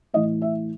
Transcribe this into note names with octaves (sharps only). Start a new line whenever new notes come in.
A2 E3 D#5
E5